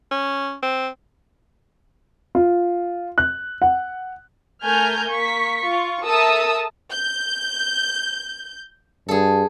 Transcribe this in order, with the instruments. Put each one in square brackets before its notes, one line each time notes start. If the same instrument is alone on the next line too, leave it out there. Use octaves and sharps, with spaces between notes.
[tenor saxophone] C#4
C4
[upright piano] F4
F#6
F#5
[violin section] A3 A#4 G#5 F6 G6
A#3 C#6 B6
F4 C#6
A4 A#4 E5 A5 D#6 E6
G6
[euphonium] G2 [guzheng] G#4 A4